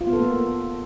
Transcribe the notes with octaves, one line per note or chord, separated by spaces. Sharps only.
F4
B3
A4
A#3